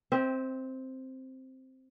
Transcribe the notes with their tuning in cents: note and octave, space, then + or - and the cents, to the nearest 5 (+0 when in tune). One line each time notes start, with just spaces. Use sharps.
C4 +0 E5 -35